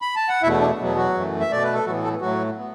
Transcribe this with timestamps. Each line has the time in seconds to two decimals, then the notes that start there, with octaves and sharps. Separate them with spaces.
0.02 B5
0.16 A5
0.29 F#5
0.42 E2 B2 A3 E4 E5
0.61 D4
0.78 E2 B2 F#3 B3
0.96 F#3 F#4
1.14 F#2 E3 A3
1.40 E5
1.50 B2 A3 D5
1.63 B4
1.74 A4
1.86 A2 E3 F#3 B3 F#4
2.04 A3 A4
2.21 A2 F#3 A3 F#4
2.58 B3